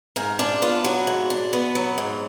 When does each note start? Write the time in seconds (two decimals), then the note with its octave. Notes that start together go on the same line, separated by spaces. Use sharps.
0.16 G#2 A#4
0.39 D4 F4
0.62 B3 F4
0.84 F#3 F#4
1.07 G#2
1.30 D4
1.53 B3
1.75 F#3
1.98 G#2